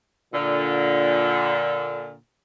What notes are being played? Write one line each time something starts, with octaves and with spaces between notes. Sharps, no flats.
A#2 D3